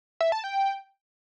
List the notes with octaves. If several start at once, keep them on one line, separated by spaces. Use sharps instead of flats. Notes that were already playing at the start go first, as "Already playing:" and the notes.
E5
A5
G5